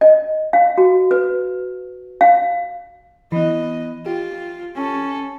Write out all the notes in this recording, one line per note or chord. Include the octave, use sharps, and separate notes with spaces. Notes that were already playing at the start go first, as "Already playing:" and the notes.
D#5
F5
F#4
B4
F5
E3 B3 D#5
F4 G4
C#4 A4